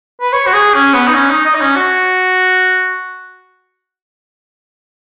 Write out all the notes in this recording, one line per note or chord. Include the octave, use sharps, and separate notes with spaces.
B4
C#5
F#4
G#4
C#4
B3
D#4
C#4
D#4
D#5
D#4
C#4
F#4